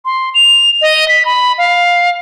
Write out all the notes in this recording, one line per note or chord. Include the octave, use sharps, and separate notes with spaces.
C6
F7
D#5
B6
B5
F5